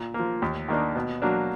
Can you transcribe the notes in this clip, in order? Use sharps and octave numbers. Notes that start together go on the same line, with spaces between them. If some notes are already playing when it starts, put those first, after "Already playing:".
Already playing: A#2
A#3
F3
D#2
D#3 A#3 D4
B2
F#3 A#3 D4